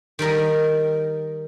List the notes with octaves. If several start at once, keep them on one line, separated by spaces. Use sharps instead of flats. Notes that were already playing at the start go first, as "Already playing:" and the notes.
D#3 G3 A#4 D#5